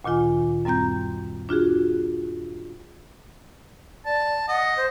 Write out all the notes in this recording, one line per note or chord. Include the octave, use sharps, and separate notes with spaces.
D2 A#2 D#3 F4 G#5
F#2 G3 C4 A#5 G6
D4 F4 F#4 G#4
D5 A5
D#5 F#5
C5